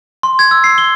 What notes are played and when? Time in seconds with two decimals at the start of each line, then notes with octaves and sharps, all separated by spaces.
0.23 C6
0.39 G#6
0.51 E6
0.64 C7
0.78 G7